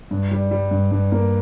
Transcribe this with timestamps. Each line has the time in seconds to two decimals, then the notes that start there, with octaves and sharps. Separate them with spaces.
0.11 G2
0.31 G3
0.51 G3
0.71 G2
0.91 G2
1.12 A#3